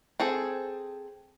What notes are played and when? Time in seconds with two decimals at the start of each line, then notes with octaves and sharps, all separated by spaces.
0.20 C4 G#4 A4 C5